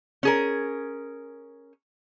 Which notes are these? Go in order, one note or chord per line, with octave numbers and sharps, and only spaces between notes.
C#4 G#4 A#4